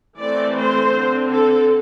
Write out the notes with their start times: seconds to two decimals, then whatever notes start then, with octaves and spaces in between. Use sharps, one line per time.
0.20 E3 A3 C4 D5
0.57 C5
0.95 D3 C4
1.32 A4